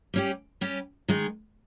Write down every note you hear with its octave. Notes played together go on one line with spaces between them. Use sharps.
G3 C#4 G4
G3 C#4 G4
D#3 G#3 D#4 G#4